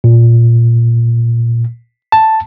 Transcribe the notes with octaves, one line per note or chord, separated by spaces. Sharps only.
A#2
A5